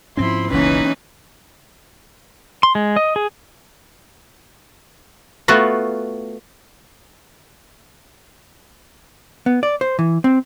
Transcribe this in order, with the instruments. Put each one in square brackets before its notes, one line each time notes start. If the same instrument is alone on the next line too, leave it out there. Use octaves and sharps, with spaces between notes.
[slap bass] G#2 C4 C#4 [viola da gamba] F3 E4 [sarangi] C6
[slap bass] F#1 C#2 B2 [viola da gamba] E3 A#3 D#4 [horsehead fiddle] C#4 [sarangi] B4
[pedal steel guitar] C6
G#3
D#5
G#4
[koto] A3 B3 F4 F#4
[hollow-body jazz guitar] B3
D5
C5
E3
C4